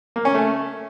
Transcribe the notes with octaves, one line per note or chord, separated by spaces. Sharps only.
A#3
C#4
A3